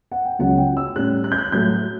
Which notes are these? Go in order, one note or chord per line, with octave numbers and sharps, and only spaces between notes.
F#5
G5
C#2 C#3 F#3 C#4 F#5
G5
E6
A2 G3 C#4 F#6
F#6
G6
F#6
A2 F#3 A3 G6